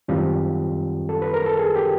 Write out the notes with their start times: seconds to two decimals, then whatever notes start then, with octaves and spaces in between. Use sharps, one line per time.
0.08 F#2 D#3 G3 C4 F4 G4
1.09 A4
1.22 B4
1.34 A#4
1.46 A4
1.59 G#4
1.76 G4